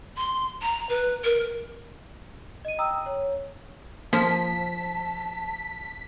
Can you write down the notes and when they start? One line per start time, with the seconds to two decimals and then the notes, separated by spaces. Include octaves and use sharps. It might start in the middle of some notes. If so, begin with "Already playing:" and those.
0.17 C6
0.62 A#5
0.89 B4
1.24 A#4
2.65 D#5 D#7
2.78 G5 A#5 D#6 E6
3.06 C#5
4.13 F3 A#3 A5 B6